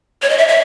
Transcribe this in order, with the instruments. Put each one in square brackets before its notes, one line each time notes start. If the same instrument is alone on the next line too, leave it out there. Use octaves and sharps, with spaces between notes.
[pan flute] C#5
D#5
E5
E5